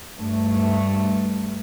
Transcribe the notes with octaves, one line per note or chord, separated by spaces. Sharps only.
G2 A3